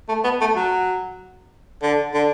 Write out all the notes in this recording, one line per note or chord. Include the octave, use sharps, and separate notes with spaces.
A3
B3
A3
F#3
D3
D3